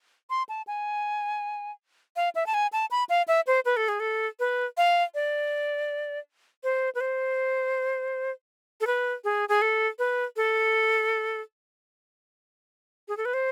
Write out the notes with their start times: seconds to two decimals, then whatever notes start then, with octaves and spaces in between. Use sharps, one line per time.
0.30 C6
0.49 A5
0.67 G#5
2.16 F5
2.35 E5
2.46 A5
2.54 G#5
2.73 A5
2.91 B5
3.09 F5
3.28 E5
3.47 C5
3.65 B4
3.77 A4
3.88 G#4
4.00 A4
4.40 B4
4.77 F5
5.15 D5
6.64 C5
6.95 B4
7.00 C5
8.81 A4
8.87 B4
9.24 G#4
9.49 G#4
9.62 A4
9.99 B4
10.36 A4
13.08 G#4
13.17 A4
13.25 B4
13.34 C5